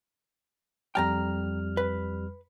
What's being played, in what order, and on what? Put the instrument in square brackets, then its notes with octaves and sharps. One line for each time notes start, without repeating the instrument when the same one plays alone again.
[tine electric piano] F2 G3 F6 [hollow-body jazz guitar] G5 A5 A#5
[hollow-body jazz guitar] B4